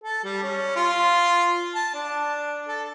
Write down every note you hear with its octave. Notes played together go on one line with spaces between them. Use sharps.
A4
G3
C#4
F4
A5
D4
A4